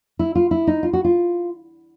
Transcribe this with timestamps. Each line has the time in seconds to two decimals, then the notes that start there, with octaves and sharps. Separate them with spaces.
0.19 E4
0.35 F4
0.51 E4
0.67 D#4
0.83 F4
0.93 F#4
1.04 F4